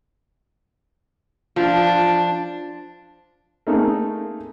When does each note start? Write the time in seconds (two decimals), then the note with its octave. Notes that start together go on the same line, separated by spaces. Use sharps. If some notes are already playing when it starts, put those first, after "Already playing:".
1.56 F3 D4
3.67 A3 A#3 C4 D#4 G#4 A4